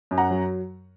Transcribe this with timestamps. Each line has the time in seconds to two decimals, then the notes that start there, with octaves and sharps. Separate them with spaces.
0.11 F#2
0.18 F#5 A#5
0.31 F#3